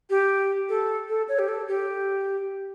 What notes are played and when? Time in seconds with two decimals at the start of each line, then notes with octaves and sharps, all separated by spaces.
0.10 G4
0.69 A4
1.09 A4
1.28 C#5
1.39 G4
1.49 A4
1.68 G4